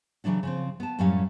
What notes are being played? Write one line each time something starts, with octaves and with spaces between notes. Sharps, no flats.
C#3 E3 F#3 D4 F#4
C#3 F3 C4
B3 A5
F#2 A2 F#3 G3 C#4 F5